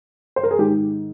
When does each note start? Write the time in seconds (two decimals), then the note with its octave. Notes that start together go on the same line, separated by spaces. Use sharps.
0.36 C5
0.43 A#4
0.51 G#4
0.59 G#2 D#3 G4